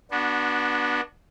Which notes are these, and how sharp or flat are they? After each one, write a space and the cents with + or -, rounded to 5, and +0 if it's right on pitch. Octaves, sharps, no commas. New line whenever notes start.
B3 -25 D4 +0 F#4 +0